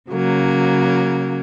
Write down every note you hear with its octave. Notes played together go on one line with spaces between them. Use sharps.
C#3 F#3 A#3